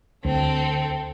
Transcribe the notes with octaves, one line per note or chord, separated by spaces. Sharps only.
D2 C4 A4